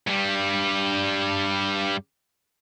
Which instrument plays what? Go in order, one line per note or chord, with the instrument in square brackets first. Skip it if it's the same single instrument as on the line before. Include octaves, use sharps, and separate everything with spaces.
[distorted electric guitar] G2 G3